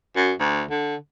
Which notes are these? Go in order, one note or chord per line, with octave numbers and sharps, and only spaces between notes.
F#2
D2
D3